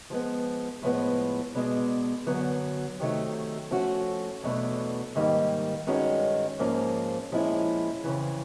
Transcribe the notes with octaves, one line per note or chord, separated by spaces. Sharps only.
F3 G#3 B3
A2 F3 G#3 B3
B2 G#3 B3 D4
F#2 D3 F#3 B3
C3 D#3 F#3 A3
F3 A3 C#4 F#4
E2 B2 F#3 A3 D4
G#2 D#3 G3 A#3
G2 D#3 G#3 C#4 F#4
G#2 F3 A#3 C#4
A#2 F3 G#3 C#4 E4
F2 C#3 E3